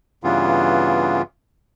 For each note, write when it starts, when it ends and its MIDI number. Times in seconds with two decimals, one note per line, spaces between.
0.24 1.22 43
0.24 1.22 49
0.24 1.22 52
0.24 1.22 59
0.24 1.22 65